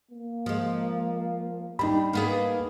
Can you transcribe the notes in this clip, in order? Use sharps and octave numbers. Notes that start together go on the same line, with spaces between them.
A#3
F3 G#3
G3 D4 D#4 B5
A#3 B3 G#4